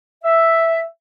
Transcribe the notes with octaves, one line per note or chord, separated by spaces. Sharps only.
E5